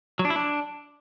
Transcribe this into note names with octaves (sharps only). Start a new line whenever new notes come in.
F#3
D4
E4
D4